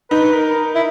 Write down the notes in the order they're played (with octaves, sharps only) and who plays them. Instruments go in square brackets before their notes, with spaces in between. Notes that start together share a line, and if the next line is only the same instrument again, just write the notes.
[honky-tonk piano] D#4 [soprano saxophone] B4
[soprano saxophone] A#4
E4